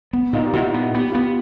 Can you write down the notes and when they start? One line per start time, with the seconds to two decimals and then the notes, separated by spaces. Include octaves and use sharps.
0.13 B3
0.33 A#2 D#4 F4
0.44 G4
0.53 A#2 E4 F#4
0.74 B3
0.94 B3 G4
1.11 B3 F4 G4